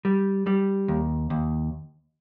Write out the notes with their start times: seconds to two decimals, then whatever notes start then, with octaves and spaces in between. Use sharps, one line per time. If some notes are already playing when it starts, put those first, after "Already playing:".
0.05 G3
0.47 G3
0.88 D#2
1.30 D#2